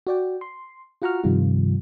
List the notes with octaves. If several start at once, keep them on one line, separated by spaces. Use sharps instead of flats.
F#4 D5 G5
C6
F4 F#4 F#5 A#5 C#6 F6
G2 C3 D#3 F3 G3 F4